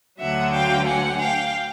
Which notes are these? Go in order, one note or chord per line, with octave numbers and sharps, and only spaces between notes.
D2 D3 F#3 E5 F#5
F5 G5
F#5 G#5
F5 G5